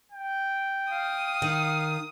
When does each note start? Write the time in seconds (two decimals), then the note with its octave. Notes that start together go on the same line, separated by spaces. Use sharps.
0.12 G5
0.91 F5 D#6
1.42 D#3